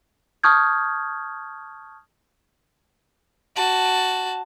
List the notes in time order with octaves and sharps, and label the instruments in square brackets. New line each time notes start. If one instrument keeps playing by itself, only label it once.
[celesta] A5 C#6 D#6 F6 G6 G#6
[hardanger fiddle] F#4 A5